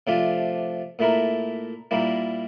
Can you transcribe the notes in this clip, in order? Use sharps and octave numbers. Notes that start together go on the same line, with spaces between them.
C3 F3 A3 D4 F4
A#2 A3 E4 A#4
A#2 G3 A#3 E4